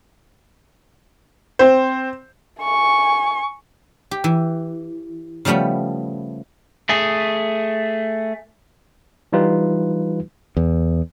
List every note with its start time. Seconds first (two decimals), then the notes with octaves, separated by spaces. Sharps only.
1.59 C4 C5
2.61 G#5 C#6
4.11 G4
4.24 E3
5.45 C#3 F3 G3 A3 B3
6.89 A3 G#4
9.33 E3 G3 D#4 F4 G4 B4
10.57 E2